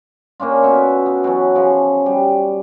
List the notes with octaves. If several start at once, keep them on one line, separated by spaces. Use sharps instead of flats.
A#3 C#4 D4 F4
B2 E5 C#6
B3
B2 E3 F#3
C#3 F3
G3